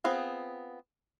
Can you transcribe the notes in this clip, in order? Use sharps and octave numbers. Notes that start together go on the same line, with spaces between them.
B3 C4 F4 G#4